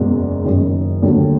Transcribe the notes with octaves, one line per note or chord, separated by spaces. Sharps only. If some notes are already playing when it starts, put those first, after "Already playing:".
Already playing: F#1 E2 B2 G#3
F#1 F#2 D#3
D#2 D3 F#3 A3